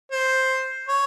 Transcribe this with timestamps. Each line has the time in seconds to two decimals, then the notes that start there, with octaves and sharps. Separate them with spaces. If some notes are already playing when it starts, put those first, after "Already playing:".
0.11 C5
0.88 C#5